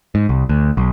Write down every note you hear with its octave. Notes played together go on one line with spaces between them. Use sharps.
G#2
C2
D2
B1